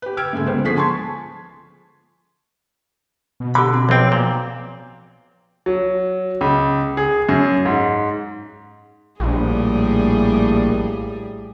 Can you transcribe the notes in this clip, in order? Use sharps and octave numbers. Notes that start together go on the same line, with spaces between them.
G4 B4
G5 E6 F6 G#6 D7
G#2 C#3 G#3 A3
C#2 B3 C5
D3 F3 G#4 C#6 B6 C7
G#5 A5 C6 C#6 G#6
B2
D3 G4 B5
C4
B1 F3 C4 G5
A#2
F#3
C#2
G#4
F#2
G#2
A#1 A2 G3 G#4